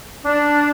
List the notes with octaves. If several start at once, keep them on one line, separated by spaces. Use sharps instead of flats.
D4